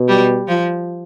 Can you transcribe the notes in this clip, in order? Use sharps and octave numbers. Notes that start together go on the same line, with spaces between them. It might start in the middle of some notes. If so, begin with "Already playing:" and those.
Already playing: B2
G3
F3